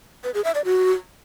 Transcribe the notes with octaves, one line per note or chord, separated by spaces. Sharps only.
B4
G#4
E5
D5
F#4